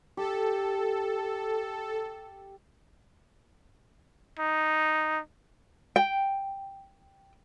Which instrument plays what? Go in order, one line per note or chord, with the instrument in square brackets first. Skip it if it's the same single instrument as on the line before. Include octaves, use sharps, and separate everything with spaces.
[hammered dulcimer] G4 [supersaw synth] A4
[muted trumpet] D#4
[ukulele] G5